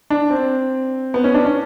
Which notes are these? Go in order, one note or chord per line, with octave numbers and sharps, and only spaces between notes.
D4
C4
B3
C#4
D4
C#4